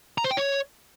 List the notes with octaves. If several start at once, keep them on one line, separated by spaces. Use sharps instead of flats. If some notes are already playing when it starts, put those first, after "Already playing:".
A#5
C5
G5
C#5